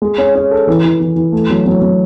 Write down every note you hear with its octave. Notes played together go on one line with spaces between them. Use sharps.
G#3
C#4
C#4
A4
E3
E3
E3
E3
A3
F#3
F#3
F#3